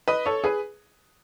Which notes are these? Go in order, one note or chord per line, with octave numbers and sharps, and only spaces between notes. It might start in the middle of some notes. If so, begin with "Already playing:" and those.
B4 D#5
A4 C#5
G#4 B4